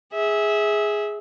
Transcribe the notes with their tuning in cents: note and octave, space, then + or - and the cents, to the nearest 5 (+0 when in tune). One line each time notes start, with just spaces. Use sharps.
G#4 +0 E5 -20